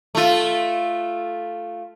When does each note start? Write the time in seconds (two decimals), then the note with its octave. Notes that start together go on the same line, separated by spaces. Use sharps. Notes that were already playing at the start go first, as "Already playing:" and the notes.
0.15 A3 F4